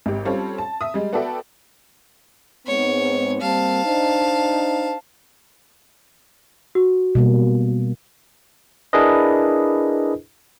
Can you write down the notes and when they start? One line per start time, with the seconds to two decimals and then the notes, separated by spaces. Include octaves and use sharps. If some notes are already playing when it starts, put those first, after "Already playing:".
0.06 G#1 G4
0.25 G3 C4 C#4 F4 A4 C#5
0.58 A5
0.81 E5 D#6
0.94 G3 G#3
1.13 B3 F#4 A4 D5 E5 G5
2.67 G#2 B3 C4 C#5
3.41 G3 A#3 C4 F5 A5
3.84 D4 D#4 C5
6.75 F#4
7.15 B2 G3 A#3
8.93 D4 E4 G#4 A#4 B4 D#5